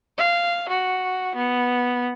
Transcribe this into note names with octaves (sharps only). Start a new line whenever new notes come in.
F5
F#4
B3